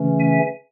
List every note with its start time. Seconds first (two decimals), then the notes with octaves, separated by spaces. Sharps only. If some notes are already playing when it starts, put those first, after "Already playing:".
Already playing: C#3 E3 A3 C#4
0.20 E5 G#5